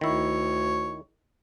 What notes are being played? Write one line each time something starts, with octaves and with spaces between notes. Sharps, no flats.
D2 D#3 E4 C#5